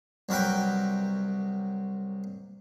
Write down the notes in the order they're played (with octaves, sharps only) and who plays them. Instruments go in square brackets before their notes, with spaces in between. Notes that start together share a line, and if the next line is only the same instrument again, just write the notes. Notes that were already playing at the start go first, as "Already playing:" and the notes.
[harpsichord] C2 F#3 A#4 B4 G5